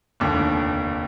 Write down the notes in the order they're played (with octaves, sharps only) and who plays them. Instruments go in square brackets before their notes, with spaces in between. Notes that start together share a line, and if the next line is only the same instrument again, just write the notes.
[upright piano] F1 D#2 D3